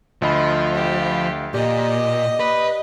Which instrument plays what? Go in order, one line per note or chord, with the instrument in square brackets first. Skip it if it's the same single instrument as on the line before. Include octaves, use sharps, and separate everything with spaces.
[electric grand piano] D2 D#5 B5 [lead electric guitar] F3
[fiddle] G4
[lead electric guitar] A#2 [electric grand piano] G4 D5 [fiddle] D#5
[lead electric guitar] B4